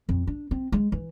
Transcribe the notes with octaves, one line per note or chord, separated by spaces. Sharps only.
F2
D4
C4
G#3
E3